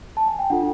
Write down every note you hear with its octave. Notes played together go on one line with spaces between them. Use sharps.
A5
G#5
G5
D4 F4 A4 F#5